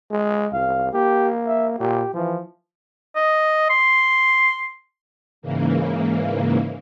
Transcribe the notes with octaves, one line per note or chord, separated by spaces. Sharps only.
G#3
C2 F5
A#3 G4
E5
A#2 G4
E3 F3
D#5
C6
G#2 C#3 E3 A#3